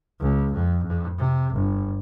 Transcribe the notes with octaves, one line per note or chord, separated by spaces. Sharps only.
C#2
F2
F2
C3
G1